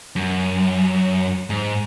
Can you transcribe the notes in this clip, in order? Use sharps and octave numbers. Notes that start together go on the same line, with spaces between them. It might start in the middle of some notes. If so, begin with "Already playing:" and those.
F#2
G#2